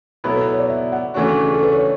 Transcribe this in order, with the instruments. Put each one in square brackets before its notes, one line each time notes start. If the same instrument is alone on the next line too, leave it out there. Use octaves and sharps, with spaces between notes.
[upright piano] B2 F#3 B3 E4 [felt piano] A4
[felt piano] B4
C#5
D5
E5
F#5
[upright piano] C#3 E3 A3 D4 F#4
[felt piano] G#4
A4
B4
C#5